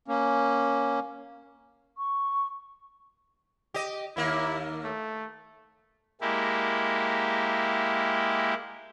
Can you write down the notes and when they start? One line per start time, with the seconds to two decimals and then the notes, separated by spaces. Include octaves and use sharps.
0.08 A#3 C#4
1.98 C#6
3.74 G4 D#5
4.17 D#2 A#3 E4
4.84 A3
6.21 G#3 A#3 E4 G4